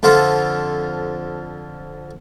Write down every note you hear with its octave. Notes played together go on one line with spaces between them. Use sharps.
F2 D3 F4 A4